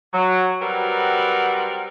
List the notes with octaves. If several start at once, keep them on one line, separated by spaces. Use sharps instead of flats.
F#3
F#3 G3 C4 A#4 B4 F#5